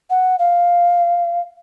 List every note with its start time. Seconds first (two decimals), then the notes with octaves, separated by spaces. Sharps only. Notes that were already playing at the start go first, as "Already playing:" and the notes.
0.10 F#5
0.39 F5